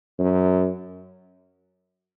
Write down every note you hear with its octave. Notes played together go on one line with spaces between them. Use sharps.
F#2